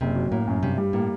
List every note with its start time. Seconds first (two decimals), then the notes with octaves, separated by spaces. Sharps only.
0.01 F#1 C3
0.16 F#3
0.31 A2 A#3
0.47 F#2
0.63 G2 C3
0.78 G3
0.93 A2 A#3